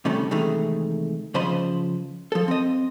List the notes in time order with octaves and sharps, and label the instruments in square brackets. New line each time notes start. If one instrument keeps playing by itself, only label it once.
[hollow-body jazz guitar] C3 D#3 G3 A3 C#4
C3 D#3 E3 G#3 A3 D#4
C#3 F3 C5 D#5 B5
F3 A4
C4 D#5